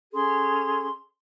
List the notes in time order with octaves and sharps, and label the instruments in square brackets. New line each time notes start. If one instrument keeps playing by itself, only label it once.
[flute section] C#4 G#4 A4 C6